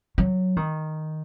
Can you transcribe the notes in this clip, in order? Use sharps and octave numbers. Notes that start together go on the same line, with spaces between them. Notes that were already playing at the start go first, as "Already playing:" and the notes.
F#3
D#3